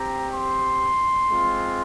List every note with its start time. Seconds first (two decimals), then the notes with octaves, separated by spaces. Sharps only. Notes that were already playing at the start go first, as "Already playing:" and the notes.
Already playing: C4 G4 A#5
0.33 C6
1.29 G#3 C4 F4